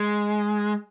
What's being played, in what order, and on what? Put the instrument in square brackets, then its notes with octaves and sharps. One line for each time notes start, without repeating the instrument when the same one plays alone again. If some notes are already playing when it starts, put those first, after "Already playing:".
Already playing: [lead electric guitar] G#3